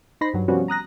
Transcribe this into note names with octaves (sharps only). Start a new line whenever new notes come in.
D#4 C5 B5 A#6 C7
G2 F#3
C3 F3 G3 B3 C#4 F#4
A#5 D#6 F#6 A#6